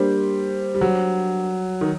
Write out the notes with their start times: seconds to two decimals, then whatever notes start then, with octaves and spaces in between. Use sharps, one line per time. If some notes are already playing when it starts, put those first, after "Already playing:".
Already playing: G3 A#3 D4 G4 C5
0.75 G3
0.81 F#3
1.81 D#3